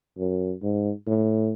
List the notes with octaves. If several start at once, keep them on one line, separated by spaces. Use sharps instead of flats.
F#2
G#2
A2